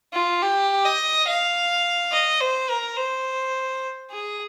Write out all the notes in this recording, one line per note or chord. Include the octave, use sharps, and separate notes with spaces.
F4
G4
D#5
F5
D#5
C5
A#4
C5
G#4